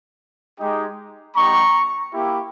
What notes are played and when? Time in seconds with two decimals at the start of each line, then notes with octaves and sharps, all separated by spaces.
0.59 G#3 D#4 G4
1.36 G3 B3 D#4 G4 A#5 C#6
2.13 A#3 E4 G4